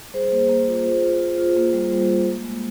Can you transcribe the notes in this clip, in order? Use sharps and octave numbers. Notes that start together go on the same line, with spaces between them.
G3 G#4 C5
A#3
A#3
F4
F4
F4
F4
F4
A#3
G3
G3
A#3
G#3
G#3